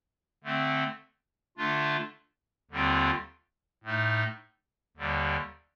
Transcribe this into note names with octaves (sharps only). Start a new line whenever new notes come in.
D3 A3 C4
D3 A3 D4 F4
D#2 D3 G3 C4 F4
A2 A3 D#4
D#2 D3 G3